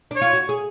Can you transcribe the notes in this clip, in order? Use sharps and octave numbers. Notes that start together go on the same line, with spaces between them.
D4 C#5
F4
F#4
G#4